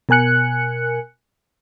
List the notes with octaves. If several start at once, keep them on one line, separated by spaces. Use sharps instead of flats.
B2 A#4 G#5 F#6 C#7